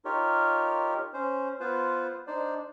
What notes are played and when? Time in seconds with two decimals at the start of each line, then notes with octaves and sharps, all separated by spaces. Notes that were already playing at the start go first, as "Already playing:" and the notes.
0.05 D#4 F4 G4 A#4 C#5
1.13 C#4 C5
1.60 B3 F4 B4 C5
2.27 D4 D#4 C5 D5